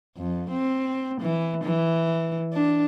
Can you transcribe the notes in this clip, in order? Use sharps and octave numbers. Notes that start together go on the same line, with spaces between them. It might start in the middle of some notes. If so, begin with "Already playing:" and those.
F2
C4
E3
E3
D4